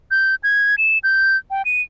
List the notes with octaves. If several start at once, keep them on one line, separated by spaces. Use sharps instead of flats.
G6
G#6
E7
G6
G5
D#7